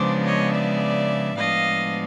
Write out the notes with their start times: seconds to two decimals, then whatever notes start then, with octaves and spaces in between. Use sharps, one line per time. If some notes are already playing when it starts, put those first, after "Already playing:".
Already playing: C#3 F3 G#3 B3 D4 C5 D5
0.25 C#5 D#5
0.53 D5 E5
1.37 A2 F3 G#3 B3 D4 D#5 F5